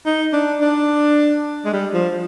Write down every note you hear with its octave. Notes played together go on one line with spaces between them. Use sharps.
D#4
D4
D4
G#3
G3
F3